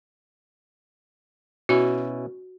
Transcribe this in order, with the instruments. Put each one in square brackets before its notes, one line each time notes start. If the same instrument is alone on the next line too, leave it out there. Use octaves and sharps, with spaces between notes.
[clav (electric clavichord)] B2 C#4 E4 [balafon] F#4